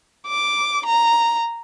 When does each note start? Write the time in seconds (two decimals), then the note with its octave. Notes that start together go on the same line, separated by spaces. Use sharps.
0.27 D6
0.86 A#5